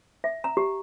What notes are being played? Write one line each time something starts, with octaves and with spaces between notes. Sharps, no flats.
E5
A#5
G4